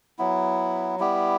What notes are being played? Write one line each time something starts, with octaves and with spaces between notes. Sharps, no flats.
F#3 B3 E4
G3 B3 E4 G4